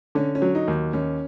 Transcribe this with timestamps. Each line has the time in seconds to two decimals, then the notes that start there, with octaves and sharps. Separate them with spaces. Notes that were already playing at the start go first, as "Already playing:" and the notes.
0.15 D3 C#4
0.35 C#4
0.42 F#3
0.55 D#4
0.68 D#2
0.93 D#2 C#4